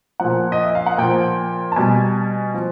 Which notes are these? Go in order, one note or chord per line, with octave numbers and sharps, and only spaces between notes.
A#2 F3 F#5
D#5
E5
F5
F#5
A#2 F3 G5
A5
B2 G3 G#5
F3